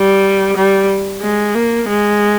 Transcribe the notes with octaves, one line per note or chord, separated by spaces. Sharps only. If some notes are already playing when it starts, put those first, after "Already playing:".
Already playing: G3
G3
G#3
A#3
G#3